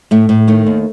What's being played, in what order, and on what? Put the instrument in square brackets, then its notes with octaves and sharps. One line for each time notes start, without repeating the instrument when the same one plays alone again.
[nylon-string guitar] A2 A3
A2
D#3 A3
D#2